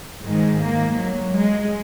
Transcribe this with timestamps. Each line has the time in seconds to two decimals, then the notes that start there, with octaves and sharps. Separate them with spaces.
0.23 G#2 D#3 G#3
0.60 A#3
0.96 F#3
1.34 G#3